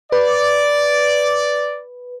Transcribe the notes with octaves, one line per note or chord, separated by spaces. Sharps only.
B4 D5